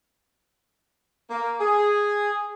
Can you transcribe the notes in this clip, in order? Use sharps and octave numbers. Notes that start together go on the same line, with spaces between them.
A#3
G#4